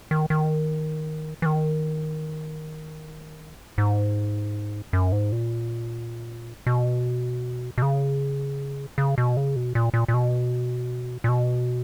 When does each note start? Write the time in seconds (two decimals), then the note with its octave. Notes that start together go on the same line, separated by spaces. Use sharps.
0.11 D#3
0.30 D#3
1.42 E3
1.46 D#3
3.78 G#2
4.93 F#2
5.12 G#2
5.32 A#2
6.67 B2
7.78 B2
7.82 C#3
8.98 C#3
9.18 B2
9.37 C#3
9.56 B2
9.75 A#2
9.94 A#2
10.08 A#2
10.14 B2
11.24 A#2
11.29 B2